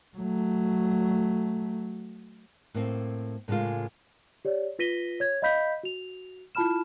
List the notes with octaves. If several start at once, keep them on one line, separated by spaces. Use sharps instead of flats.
F#3 A3
A2 A#3 C4
A2 C#3 G#3 A#3 F4
G4 C#5 D5
F4 B4 A#6 B6 D#7 G7
C#5 G#6
D#5 F5 B5 G6 B6
F#4 F7
E4 F4 A5 B5 F6 E7